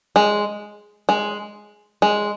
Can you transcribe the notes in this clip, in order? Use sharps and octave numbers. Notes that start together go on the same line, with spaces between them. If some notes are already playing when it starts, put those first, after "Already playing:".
G#3
G#3
G#3